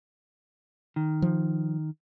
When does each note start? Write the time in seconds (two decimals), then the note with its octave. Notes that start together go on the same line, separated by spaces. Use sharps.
0.96 D#3
1.22 F3